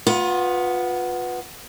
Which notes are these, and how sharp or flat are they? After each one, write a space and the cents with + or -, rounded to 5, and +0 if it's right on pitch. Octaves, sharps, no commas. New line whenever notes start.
B3 +0 F4 +30